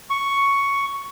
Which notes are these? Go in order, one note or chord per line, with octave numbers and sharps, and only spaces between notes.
C#6